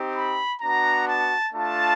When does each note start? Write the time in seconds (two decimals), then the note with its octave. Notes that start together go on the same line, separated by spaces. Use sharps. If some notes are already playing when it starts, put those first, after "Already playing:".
Already playing: C4 D#4 G4
0.14 B5
0.60 B3 D4 F#4 A#5
1.07 A5
1.53 A3 D4 F4 A5